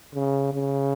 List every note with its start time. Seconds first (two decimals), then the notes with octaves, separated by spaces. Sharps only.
0.15 C#3
0.54 C#3